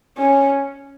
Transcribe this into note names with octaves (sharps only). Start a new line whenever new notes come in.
C#4